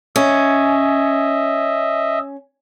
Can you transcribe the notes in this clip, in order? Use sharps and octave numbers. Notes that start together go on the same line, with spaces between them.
C#4 D#5 E5